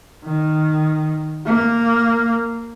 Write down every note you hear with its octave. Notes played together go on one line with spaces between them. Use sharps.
D#3
A#3